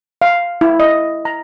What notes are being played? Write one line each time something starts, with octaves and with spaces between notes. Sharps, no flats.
F5
E4
D#5
A#5